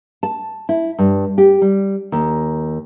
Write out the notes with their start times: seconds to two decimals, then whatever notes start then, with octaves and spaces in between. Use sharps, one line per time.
0.23 A5
0.69 E4
0.98 G2
1.38 G4
1.62 G3
2.12 D#2